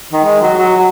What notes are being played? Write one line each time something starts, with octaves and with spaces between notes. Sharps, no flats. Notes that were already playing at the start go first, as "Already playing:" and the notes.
D#3
G#3
F#3
F#3
F#3